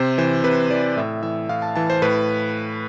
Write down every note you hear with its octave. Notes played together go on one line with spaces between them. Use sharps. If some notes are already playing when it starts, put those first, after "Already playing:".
Already playing: C3 C5
E3 C5
C3 B4
E3 D5
A2 E5
E3 E5
A2 F5
A5
E3 A5
C5
A2 B4